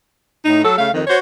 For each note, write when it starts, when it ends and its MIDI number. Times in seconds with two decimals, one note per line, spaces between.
0.45 0.60 45
0.45 0.60 63
0.63 0.77 54
0.63 0.77 69
0.77 0.88 49
0.77 0.88 57
0.77 0.88 77
0.93 1.01 41
0.93 1.01 51
1.07 1.17 66
1.07 1.17 72
1.07 1.17 73